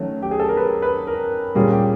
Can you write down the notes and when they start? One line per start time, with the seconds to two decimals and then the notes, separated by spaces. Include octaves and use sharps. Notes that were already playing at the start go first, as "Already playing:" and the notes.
Already playing: D#3 F#3 A3 C#4
0.22 G4
0.31 G#4
0.40 A4
0.49 A#4
0.57 B4
0.82 B4
1.07 A#4
1.55 A#2 G3 A#3 C#4 G#4
1.72 G4